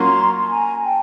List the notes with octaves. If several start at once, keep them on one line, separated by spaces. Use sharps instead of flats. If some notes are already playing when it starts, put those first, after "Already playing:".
Already playing: F#3 A#3 C#4 F4 A#5 C6
A5
G#5 A#5
G5 A5